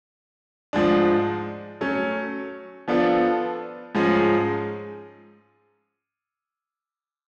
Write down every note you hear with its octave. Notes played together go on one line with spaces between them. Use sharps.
G#2 F3 G#3 D4
F#3 A3 C#4
F3 B3 D4 F4 A4
G#2 F3 G#3 C#4